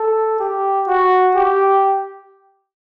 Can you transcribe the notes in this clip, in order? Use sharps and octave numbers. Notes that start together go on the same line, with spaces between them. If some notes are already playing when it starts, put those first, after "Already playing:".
Already playing: A4
G4
F#4
G4